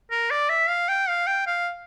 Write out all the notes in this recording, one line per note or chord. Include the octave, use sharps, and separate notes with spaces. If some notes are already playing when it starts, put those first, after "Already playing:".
A#4
D5
E5
F5
G5
F5
G5
F5